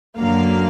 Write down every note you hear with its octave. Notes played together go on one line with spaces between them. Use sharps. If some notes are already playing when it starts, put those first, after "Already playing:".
F#2 D3 F#3 A#3 F5